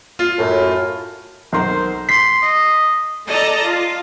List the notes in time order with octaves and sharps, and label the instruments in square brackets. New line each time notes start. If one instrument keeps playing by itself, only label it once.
[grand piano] F4
[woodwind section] F#2 A2
[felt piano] B1 A#4 C6 [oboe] C5
[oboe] C6 [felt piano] B6 [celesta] C7
[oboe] D#5
[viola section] A4 D5 D#5 A5 A#5
F4